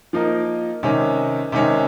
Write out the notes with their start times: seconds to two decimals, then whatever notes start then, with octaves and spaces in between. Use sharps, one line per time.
0.13 F3 A#3 D#4 A#4
0.83 C3 D#3 G#3 C#4
1.52 C3 D#3 G#3 C#4